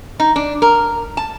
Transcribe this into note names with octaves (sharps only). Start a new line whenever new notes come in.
D#4
D4
A#4
A5